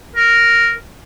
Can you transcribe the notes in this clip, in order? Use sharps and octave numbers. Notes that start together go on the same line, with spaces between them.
A#4